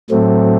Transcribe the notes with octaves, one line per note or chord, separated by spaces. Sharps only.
A2 F#3 A3 C4